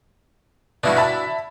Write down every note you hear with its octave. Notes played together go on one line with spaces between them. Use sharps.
G2 B2 D4 E4 F#4
E5 A5 B5